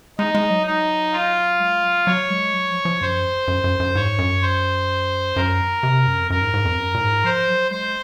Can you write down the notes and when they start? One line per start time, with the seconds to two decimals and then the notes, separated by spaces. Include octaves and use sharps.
0.18 G#3 D#4
0.35 G#3
0.50 F#3
0.66 D#4
1.13 F4
1.60 G#3
1.83 F#3
2.06 F#3 C#5
2.30 G#3
2.54 F#3
2.70 F3
2.85 F3
3.01 F#2 C5
3.48 F#2
3.64 F#2
3.80 F#2
3.95 G#2 C#5
4.18 F#2
4.42 C5
5.36 F#2 A#4
5.83 C3
6.07 F#2
6.20 F2
6.30 F#2 A#4
6.42 G#2
6.54 G#2
6.65 F2
6.77 F#2
6.94 A#2
7.01 G#2
7.24 F3 C5
7.48 F#3
7.71 G#3 C5